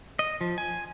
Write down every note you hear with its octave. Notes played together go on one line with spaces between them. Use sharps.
D#5
F3
G#5